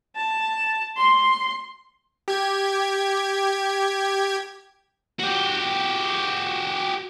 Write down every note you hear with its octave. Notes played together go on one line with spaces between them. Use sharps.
A5
C6
G4 G#6
F#4 G4